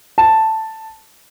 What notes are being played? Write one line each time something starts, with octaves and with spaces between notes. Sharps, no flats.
A5